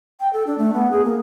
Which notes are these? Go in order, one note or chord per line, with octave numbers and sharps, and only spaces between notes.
G5
A4
D4
A3
B3
G#4
A#3